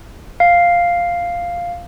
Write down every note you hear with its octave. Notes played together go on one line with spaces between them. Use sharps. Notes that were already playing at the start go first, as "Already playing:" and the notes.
F5